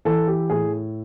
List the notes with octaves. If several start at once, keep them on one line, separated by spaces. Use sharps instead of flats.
E3 A4
G4
A2 G#4